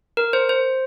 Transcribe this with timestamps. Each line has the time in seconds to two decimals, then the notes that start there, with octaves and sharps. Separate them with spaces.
0.17 A#4
0.33 C5
0.49 C5